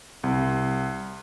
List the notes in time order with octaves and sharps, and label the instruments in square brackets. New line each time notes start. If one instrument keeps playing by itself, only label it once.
[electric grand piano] C2